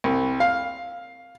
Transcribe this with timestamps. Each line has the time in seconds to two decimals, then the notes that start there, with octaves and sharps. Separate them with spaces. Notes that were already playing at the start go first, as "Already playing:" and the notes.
0.04 C2
0.40 F5